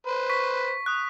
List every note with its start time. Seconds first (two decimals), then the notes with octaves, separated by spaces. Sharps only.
0.07 B4 C5
0.29 C#6 B6
0.86 D#6 F#6